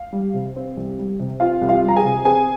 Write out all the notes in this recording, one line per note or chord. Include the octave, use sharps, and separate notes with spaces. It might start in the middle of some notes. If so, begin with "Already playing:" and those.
Already playing: F5
G3
C3
C4
C2
G3
C3
C4 F4 F5
C2
F4 F5
G3
A#5
G#4 G#5
C3
C4 G#4 G#5